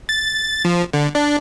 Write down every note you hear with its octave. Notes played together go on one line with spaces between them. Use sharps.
A6
F3
D3
D4